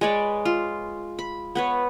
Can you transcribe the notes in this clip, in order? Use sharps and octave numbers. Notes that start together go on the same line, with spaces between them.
G#3 B4 C#5 D5
F4
B5
B3 B4 C#5